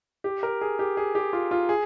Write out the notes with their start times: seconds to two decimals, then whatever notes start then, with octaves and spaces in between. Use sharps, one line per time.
0.24 G4
0.43 A#4
0.61 G#4
0.79 G4
0.97 G#4
1.15 G4
1.33 F4
1.51 F4
1.69 G#4